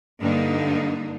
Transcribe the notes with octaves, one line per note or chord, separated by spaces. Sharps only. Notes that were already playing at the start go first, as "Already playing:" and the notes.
G2 D3 A#3 D#4